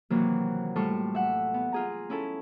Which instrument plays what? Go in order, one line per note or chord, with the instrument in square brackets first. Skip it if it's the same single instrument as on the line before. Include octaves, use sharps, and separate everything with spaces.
[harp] C3 D#3 E3 F#3 A#3
A2 G3 F4 A4 C#6
E5 F#5
B3
F4 G#4 A#5
C#4 E4 A4